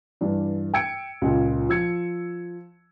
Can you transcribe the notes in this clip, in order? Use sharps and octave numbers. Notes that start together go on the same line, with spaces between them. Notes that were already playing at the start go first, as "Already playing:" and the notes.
G2 E3 D4
G5 E6 G#6 C#7 D7
C#2 A#2
F3 E6 G#6 C#7